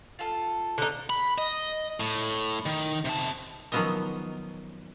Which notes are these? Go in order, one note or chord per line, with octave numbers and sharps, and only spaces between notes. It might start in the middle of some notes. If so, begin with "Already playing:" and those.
F4 A4
D3 D#4
B5
D#5
A2
D#3
C3 A5
D#3 F3 F#3 B3 C#4 D#5